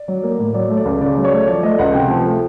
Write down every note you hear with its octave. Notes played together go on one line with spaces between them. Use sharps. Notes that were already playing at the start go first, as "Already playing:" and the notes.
Already playing: D5
F#3
A#3
A2
F#3 D5
A3
D5
C#2
C#3 D5
F#3
C#5
A3
F3 D5
A3 D#5
C#2 F#5
C3 G5
F3
A3